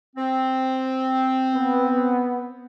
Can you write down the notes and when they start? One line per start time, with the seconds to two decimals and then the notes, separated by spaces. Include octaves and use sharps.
0.15 C4
1.54 B3